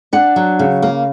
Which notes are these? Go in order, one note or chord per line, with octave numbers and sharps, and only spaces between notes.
D4 F#5
F#3
C#3
A#3